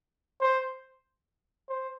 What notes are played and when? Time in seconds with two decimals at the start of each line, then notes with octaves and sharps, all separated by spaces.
0.41 C5
1.69 C5